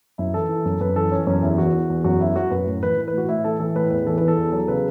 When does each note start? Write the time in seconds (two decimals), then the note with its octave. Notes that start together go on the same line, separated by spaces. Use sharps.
0.18 F#2 E4
0.34 E3 A4
0.49 E3
0.65 F#2
0.80 F#2 B4
0.96 E3 A4
1.11 E3 C#4
1.27 F#2 C#4
1.42 E2 E4
1.58 E3 F#4
1.74 E3
1.90 E2
2.04 F#2 F#4
2.20 F#3 E4
2.36 F#3 F#4
2.51 F#2 B4
2.66 A2
2.83 E3 B4
2.97 E3
3.08 B4
3.13 A2 F#4
3.29 A2 E4
3.44 E3 A4
3.60 E3 A4
3.75 A2 B4
3.91 E2 B4
4.06 E3 A4
4.17 E3 B4
4.28 A4
4.37 E2
4.52 F#3 A4
4.68 C#3 B4